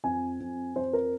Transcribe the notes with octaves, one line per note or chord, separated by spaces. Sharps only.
F2 G#5
F2
F2 C5
A#4